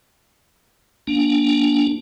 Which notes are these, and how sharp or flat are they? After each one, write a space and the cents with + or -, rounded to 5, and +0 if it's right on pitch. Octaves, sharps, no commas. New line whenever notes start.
A#3 +25 D4 -20